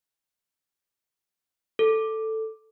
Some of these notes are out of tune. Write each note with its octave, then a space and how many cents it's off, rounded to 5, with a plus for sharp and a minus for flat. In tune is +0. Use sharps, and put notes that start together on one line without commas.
A4 +5